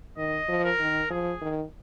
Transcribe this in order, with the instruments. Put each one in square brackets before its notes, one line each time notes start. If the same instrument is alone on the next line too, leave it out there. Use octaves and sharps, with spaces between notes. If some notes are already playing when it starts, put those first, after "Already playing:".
[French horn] D#3 [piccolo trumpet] D#5
[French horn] F3
[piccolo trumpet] A#4
[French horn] D#3
[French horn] F3 [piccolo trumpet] G#4
[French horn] D#3